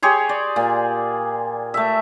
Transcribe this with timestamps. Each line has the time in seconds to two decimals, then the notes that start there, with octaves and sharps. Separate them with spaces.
0.02 G4 G#4 C#5 C6
0.29 D5
0.56 A#2
1.74 A3 E5